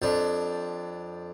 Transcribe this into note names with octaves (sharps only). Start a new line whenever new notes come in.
F2 F3 D4